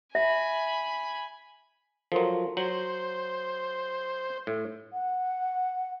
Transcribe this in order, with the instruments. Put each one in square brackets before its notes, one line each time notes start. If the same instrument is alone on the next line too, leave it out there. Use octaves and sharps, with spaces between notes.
[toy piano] E5 [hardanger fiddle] G#5 B5
[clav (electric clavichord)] F3 F#3 [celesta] A4 A#4 C6
[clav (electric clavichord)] F#3 [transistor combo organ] C5 [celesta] F#7
[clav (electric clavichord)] A2
[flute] F#5